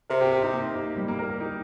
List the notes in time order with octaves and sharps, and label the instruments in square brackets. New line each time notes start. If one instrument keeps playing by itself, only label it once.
[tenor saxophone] C3 [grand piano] A#4
[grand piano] G4
G4
D#4
A#3
A#3
G3
A#3
A#4
G4
D#4